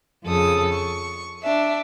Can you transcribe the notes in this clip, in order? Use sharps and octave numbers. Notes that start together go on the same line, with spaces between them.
F2 C#3 A4 D#6
C#6
D4 E5